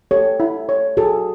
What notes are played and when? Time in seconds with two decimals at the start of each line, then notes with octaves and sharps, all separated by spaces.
0.11 G4 A4 C#5
0.40 E4
0.69 C#5
0.97 F#4 G#4 A4